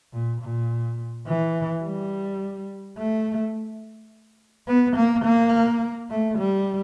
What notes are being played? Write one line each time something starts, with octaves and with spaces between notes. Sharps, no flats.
A#2
A#2
E3
G3
A3
B3
A#3
A#3
A3
G3